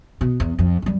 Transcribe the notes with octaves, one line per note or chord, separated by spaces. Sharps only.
B2
E2
F2
F#2 G3